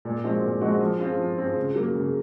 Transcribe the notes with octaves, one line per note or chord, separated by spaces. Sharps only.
A#2
F3 G#3 C4 F#4
A#2
F3 G#3 C4 F#4
F3
C4 F4 G#4
F3
C4 F4 G#4
C#3
F#3 A#3
C#3